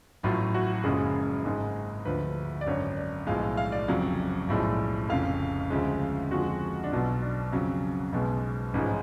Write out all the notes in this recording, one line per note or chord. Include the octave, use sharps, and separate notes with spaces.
A1 A2 F#3 F4
F#4
F#1 F#2 C#3 F3 G#3 G#4
G#1 G#2 G#3
D2 D3 F3 B4
D5
G#1 F#2 D3 C#5
D5
B1 A2 F3 G#3 F5
F5
F5
D5
F1 F2 C#3 F#3
B1 A2 F3 G#3
F1 F2 C#3 F5
D2 C#3 F3 G#3
F2 D3 F3 G#3 F#4
D4
B1 B2 F#3 F4
D4
F2 C#3 F#3
B1 B2 G#3
A1 G#2 F3 G#3 C#4